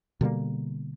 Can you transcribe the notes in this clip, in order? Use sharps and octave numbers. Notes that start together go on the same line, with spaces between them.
B2 D3 G3 A#3